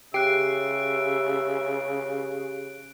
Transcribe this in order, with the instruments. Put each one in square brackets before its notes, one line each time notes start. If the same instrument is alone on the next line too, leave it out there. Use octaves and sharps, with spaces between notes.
[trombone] C#3 [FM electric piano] G4 C7 [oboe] E5 [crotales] F#6 D7